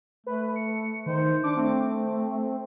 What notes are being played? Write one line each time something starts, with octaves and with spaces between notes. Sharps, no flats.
A3 B4
C#7
D#3 C5
D4 D6
A3 C4